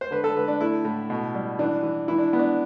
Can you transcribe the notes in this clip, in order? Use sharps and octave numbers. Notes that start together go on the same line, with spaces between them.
C5
D3 B4
A4
D3 B4
D4
A3 E4
A2
B2
G3
E3 D4
E3
E3 E4
D4
B3
D4